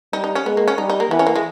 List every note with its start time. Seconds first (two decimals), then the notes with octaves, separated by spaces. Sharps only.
0.13 G3 D#4
0.24 D#4
0.35 C#4
0.45 G#3 B3
0.57 A#3
0.68 C#4
0.78 G3 D#4
0.90 D#4
1.00 A#3
1.10 E3 B3
1.19 C#4
1.27 A#3
1.36 G#3